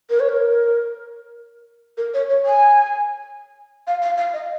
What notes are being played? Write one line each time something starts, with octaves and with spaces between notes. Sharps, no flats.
A#4
C#5
A#4
A#4
C#5
C#5
G#5
F5
F5
F5
D#5